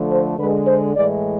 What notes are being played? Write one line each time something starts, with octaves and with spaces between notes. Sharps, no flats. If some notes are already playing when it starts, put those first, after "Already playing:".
Already playing: D3 F3 A3
C5
D3 G#3 B4
C5
A2 E3 G#3 D5